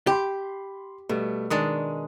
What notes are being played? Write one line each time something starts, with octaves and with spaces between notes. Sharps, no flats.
G4 B5 C6
B2 G3 A3
D#3 G#3 D4 D#6